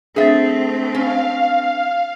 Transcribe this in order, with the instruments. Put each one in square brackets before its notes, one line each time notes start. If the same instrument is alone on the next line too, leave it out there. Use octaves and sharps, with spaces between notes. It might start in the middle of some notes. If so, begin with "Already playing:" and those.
[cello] A3 C4 [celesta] D4 A6 [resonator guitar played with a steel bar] G#4 E5
[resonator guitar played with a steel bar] C#4 [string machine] F5